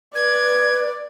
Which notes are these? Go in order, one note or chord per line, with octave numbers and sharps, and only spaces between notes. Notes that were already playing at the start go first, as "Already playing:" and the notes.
B4 D5 G#6